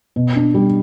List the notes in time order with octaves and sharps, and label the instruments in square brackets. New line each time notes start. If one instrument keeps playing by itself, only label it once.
[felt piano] B2
D4
G3